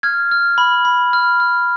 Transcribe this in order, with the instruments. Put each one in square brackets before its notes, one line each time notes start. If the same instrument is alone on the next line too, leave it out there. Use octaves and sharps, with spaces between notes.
[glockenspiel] F6 G#6
F6
B5
B5
F6
F6